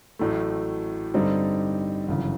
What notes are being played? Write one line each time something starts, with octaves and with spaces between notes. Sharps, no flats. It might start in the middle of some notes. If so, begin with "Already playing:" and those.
A1 A2 F#3 A3
G2 D3 G3 C4 D#4
G1 F#2 C#3 E3